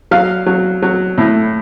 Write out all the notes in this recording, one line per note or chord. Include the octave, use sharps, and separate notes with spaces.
F#3 F5
F#3
F#3
A2